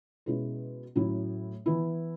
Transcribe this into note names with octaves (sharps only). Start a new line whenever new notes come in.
B2 G#3 C#4 E4
A2 F#3 C#4 E4
E3 B3 E4